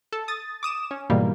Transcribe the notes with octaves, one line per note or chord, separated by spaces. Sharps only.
A4
D#6 A6
D6 D#6 E7
C#4
G#2 B2 D#3 E3 G3 A#3